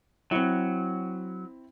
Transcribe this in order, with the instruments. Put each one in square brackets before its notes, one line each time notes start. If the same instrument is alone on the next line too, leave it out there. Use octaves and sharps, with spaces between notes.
[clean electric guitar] F#3 [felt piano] C4 E4